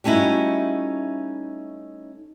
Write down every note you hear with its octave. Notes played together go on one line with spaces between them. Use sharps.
G3 A3 C#4 D#4 E4 F#4